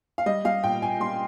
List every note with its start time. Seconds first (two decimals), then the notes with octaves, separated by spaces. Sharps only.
0.18 F5
0.26 G3 D#5
0.45 G3 F5
0.63 A#2 G5
0.82 A#2 G#5
1.00 G3 C6